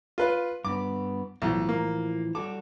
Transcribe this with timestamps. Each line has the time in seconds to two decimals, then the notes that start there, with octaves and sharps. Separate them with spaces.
0.18 F4 B4 F5
0.65 G2 B3 D6
1.42 B1 A2 E3 F3
1.69 A#3
2.35 G3 F#4 A4 D6